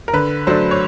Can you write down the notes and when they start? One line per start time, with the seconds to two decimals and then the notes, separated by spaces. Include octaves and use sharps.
0.08 A#4
0.13 D3 B4
0.47 F#3 A3 D4 C5
0.71 C#5